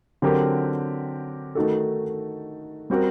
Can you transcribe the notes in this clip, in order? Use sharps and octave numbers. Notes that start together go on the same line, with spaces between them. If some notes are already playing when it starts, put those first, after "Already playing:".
D3 F#3 C4 G4 A#4
D#3 A3 D#4 F#4 A4
G3 C4 F#4 A#4